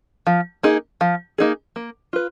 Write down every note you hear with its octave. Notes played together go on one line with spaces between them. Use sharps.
F3
A#3 D#4 G#4
F3
A#3 D#4 G#4
A#3
F4 B4